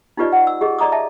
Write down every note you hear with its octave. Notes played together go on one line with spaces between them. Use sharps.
D#4 F4 G4 B4 D5 D#5
F#5
E6
G4 G#4 D#5
D5 D#5 A#5 D6 D#6
D#5 E5 A5